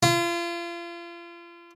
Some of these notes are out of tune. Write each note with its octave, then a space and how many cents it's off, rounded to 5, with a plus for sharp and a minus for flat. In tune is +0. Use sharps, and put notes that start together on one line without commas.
F4 -35